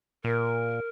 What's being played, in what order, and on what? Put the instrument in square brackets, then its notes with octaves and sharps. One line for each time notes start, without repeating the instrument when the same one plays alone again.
[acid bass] A#2 [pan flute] A#4